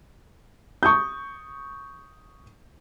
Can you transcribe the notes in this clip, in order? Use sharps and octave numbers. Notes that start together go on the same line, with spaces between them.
C#6 D#6 G6